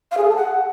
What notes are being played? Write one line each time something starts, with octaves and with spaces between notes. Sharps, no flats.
F5
G#4
A4
A5
F#5